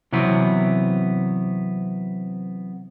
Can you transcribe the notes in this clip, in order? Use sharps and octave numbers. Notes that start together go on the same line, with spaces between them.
C3 E3 F#3 B3 C4